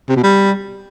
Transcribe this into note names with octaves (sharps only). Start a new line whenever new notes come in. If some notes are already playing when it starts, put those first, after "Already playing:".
C3
B2
G3